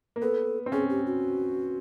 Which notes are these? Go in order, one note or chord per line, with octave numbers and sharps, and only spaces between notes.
A#3
B3 A4
C4
C#4 G#4
G4
F#4